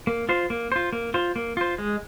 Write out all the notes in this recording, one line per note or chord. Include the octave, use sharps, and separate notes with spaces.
A#3
F4 C5
A#3
F4 C5
A#3
F4 C5
A#3
F4 C5
G#3